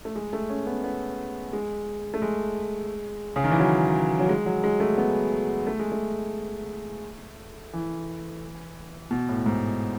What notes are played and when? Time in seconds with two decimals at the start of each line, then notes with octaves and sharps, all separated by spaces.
0.05 A3
0.16 G#3
0.33 A3
0.50 C#4
0.67 B3
0.84 B3
1.53 G#3
2.14 A3
2.22 G#3
3.36 C#3
3.44 D#3
3.52 E3
3.60 F#3
4.20 F#3
4.29 G#3
4.46 F#3
4.64 G#3
4.80 A3
4.98 B3
5.67 A3
5.80 G#3
5.92 A3
7.73 E3
9.11 B2
9.29 A2
9.46 G#2